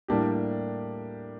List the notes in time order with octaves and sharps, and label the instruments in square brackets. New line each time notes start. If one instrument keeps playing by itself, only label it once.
[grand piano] A2 G3 A#3 D4 G4